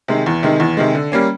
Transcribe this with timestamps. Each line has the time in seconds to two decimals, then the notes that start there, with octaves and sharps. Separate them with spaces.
0.08 C3 D#3 G#3
0.26 E2
0.43 C3 D#3 G#3
0.60 E2
0.77 C3 D#3 G#3
0.95 D3
1.12 G3 A#3 C#4